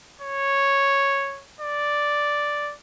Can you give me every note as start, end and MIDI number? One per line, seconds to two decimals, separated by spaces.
0.22 1.43 73
1.61 2.74 74